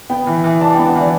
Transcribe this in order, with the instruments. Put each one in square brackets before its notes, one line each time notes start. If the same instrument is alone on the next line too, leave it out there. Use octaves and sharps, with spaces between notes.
[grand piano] B3 [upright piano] G5
[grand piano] E3
E3
[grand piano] D4 [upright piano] A5
[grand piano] B3 [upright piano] G5
[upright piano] F#5
[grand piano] E3 [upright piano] D5